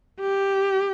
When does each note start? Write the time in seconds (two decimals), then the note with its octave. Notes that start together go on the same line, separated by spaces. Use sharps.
0.20 G4